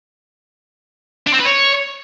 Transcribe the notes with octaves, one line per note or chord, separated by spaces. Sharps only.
D4
C4
B4
C#5